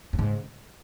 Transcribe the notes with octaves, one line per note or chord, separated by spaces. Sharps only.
F#2
G#2 C#3